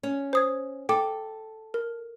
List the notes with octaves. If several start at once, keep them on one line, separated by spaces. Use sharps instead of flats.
C#4
C5 D#6 G#6
A4 G5 D6
A#4